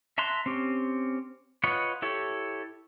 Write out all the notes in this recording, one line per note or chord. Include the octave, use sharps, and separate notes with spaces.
E5 A5 A#5 C6 F#6
C4 C#4 G4
F4 B4 C#5 D#5 F#5
E4 G4 A4 C#5